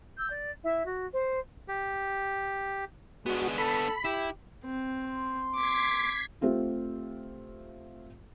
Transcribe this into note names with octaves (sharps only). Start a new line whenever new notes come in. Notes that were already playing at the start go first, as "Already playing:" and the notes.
E6 G6
D5
E4 E5
F#4
C5
G4
G#3 B3 D4 F#4
A4 B5
E4 G4
C4
C6
D6 G#6 B6 C7
A3 C4 F4 G4